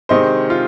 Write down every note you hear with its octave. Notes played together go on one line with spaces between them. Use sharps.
C3 D#3 G#3 C5 D#5
F4